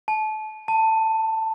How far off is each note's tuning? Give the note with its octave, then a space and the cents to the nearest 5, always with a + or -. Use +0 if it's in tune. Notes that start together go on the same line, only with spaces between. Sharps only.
A5 -30
A5 +15